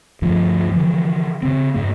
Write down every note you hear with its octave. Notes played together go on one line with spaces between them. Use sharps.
D2 G2 F3
D3 E3 F3
C#3 C4
G2 A#3